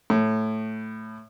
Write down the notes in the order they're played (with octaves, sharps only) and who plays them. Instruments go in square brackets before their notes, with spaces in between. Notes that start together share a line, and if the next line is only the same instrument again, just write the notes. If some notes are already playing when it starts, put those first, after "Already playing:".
[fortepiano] A2